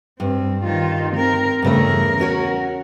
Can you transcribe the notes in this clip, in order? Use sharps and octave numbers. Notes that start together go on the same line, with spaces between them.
G2 C4
D#3 F4
C4 A#4
E2 G2 C#3 A3 A#4
C#4 F#4 C#5